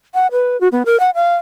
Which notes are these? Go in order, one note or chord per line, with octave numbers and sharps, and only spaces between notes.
F#5
B4
F#4
B3
A#4
F#5
F5